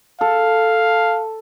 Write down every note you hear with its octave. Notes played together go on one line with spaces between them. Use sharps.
A4 F5